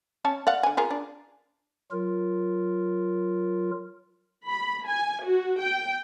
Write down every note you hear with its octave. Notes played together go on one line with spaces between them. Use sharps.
C#4 C#5 A5
D5 F5 F#5
D3 G#5
F4 G#4 A#4
D4
F#3 F4 A#4
B5
G#5
F#4
G5